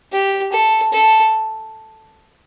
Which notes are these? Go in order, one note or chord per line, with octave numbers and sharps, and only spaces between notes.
G4
A4
A4